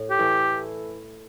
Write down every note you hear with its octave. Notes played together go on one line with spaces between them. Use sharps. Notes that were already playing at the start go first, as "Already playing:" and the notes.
Already playing: A2
G4
E3 A3 E4